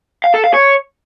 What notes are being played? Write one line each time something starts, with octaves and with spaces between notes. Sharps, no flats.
F5
A4
F5
C#5